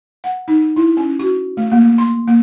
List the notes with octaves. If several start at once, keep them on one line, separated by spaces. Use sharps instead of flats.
F#5
D#4
E4
C#4
F#4
A3
A#3
C6
A#3